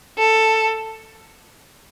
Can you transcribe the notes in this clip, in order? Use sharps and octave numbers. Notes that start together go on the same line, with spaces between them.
A4